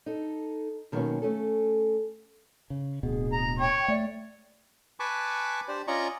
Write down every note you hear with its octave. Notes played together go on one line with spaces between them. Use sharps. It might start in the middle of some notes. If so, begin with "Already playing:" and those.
D#4 A4
B2 D#3 F#3 G3 A#3 C#4
A3 C#4 A4
C#3
D1 B2 G#4
A#5
C#5 G5
A3 D5
B4 G#5 A5 B5 C#6 D6
D4 G4 C5 D5
C#4 F4 D5 D#5 A#5 C#6